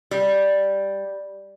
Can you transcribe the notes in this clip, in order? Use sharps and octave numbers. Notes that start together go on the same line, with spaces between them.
G3